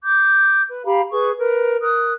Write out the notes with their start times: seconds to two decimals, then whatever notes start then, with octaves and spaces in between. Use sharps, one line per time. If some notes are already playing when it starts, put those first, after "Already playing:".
0.03 D6 G6
0.68 B4
0.86 G4 F5 A#5 B5
1.11 G#4 B4 C#6
1.37 A#4 B4
1.82 A#4 D#6 F#6